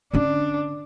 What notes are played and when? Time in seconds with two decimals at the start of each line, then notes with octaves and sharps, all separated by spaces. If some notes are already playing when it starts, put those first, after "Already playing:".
0.14 D3 C#4 D4